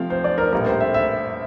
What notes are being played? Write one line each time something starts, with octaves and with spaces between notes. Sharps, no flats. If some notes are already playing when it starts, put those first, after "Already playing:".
Already playing: C3 F3 A3 C4 F5
C5
D5
A#4
A#1 A2 G3 A#4
C5
E5
E5